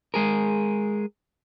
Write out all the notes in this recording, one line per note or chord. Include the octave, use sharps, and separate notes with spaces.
G#3 G#4 A#4